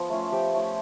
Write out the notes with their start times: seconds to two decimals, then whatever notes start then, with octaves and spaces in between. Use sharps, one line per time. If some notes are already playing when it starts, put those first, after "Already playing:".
Already playing: F3 B3
0.10 A3 C#4 F4
0.32 F3 G4
0.53 A3 C#4 F4